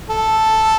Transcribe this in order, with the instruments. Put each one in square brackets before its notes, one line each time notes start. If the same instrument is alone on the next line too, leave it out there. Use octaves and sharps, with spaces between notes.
[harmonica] A4